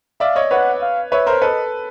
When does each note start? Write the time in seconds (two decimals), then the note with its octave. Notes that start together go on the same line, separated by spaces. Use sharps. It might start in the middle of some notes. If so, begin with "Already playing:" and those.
0.20 D5 E5 F5
0.36 C#5 D#5
0.51 B4 C#5 F#5
0.81 F5
1.11 B4 C#5 E5
1.27 A#4 C5
1.41 A4 B4 D#5